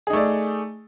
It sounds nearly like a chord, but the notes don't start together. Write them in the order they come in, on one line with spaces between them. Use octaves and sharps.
G#4 D#4 A3 D5